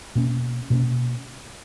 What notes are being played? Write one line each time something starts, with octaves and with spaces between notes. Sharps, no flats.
B2 A#3 C#4
B2 A#3 C#4